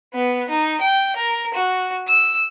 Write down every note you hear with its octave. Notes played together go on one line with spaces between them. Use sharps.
B3
D#4
G5
A#4
F#4
E6